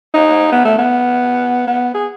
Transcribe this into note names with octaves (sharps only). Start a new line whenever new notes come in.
D#4
B3
A3
B3
B3
G#4